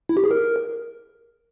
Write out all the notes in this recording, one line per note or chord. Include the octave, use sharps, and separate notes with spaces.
E4
G4
G#4
A#4